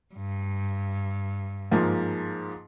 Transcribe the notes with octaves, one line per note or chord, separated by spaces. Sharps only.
G2
G#2 F3 A#3